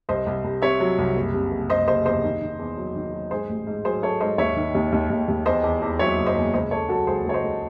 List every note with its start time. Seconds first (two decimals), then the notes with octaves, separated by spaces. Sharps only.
0.09 C2 C5 D#5
0.26 C2
0.44 C2
0.62 C3 C#5 E5
0.80 F#3
0.98 C2
1.16 F#1
1.34 C3
1.51 F#1
1.70 F#1 C5 D#5
1.87 F#1 C5 D#5
2.05 E2 C5 D#5
2.23 D#3
2.42 D#3
2.59 E2
2.77 F#3
2.96 D#3
3.14 F#3
3.31 G#2 G#4 C5
3.49 A1
3.67 G#2
3.85 F#3 G#4 C5
4.03 F#3 A4 C#5
4.20 G#2 C5 D#5
4.38 D#2 C#5 E5
4.56 D#3
4.75 D#2
4.92 D#2
5.10 D#2
5.28 D#2
5.46 E2 C5 D#5
5.64 E2
5.82 E2
5.99 F#3 C#5 E5
6.18 F#1
6.26 C5 D#5
6.36 E2
6.53 C#2 C5 D#5
6.71 C#2 A4 C#5
6.89 F#3 F#4 A4
7.07 C#2 G#4 C5
7.25 C#2 C#5
7.34 C5 D#5
7.43 C#2